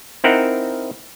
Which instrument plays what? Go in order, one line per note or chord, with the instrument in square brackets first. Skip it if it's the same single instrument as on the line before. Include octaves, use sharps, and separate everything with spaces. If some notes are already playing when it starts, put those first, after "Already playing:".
[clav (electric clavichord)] C4 D#4 E4 A#4 F#5